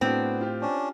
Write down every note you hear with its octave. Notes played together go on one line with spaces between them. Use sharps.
A2 B3 C4 D4 F#4
F4 G4
C#4 D4